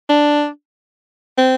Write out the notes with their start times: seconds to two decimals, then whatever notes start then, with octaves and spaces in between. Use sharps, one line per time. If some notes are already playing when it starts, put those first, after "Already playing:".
0.10 D4
1.38 C4